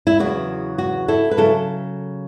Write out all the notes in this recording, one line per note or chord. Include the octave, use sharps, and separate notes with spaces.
E4
E2 C#3 F#3 B3 F#4
F#4
E4 A4
B4
C#3 F#3 E4 A4